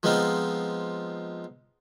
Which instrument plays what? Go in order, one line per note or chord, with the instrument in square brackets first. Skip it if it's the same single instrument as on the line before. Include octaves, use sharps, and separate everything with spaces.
[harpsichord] F3 G#3 B3 C4 D#4 F4